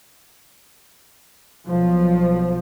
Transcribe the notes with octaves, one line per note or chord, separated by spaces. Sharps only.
B1 F3